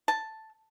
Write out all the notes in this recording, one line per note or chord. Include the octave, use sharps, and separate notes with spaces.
A5